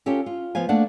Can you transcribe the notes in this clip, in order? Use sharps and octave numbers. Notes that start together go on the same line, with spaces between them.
C#4 F4 G4 A4
F4
F3 B3 C5 F5 G#5
A3 A#3 D4 F#5